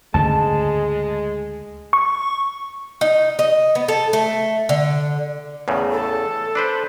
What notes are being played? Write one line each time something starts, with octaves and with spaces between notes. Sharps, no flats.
D2 G#2 C#3 G#3 A5
C#6
D#4
D#5
B3
A4
A3
D3
E2 A2 C#3
A4
D4 B4 C5